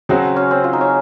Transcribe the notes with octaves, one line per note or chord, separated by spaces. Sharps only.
C#3 F#3 C4 F#4 G#4
C#4
C4
F4
D#4
C#4